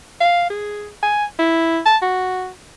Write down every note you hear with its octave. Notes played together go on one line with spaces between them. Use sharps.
F5
G#4
G#5
E4
A5
F#4